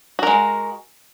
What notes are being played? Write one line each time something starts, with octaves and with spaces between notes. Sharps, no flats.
G#3 F#4 A#4